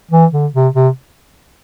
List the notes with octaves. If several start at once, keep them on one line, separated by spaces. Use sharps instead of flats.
E3
D3
C3
C3